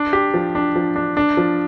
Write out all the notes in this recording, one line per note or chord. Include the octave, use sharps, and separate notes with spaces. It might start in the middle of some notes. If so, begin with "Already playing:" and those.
Already playing: D4
G4
F3
D4
F3
D4
D4
F3